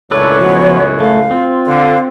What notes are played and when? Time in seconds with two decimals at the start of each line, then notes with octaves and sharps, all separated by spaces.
0.11 C#2 F#2 A2 D4 A4 B4 C#5
0.41 F3 B3 F#4
1.00 A3 F5
1.31 C4 F4
1.67 D3 F5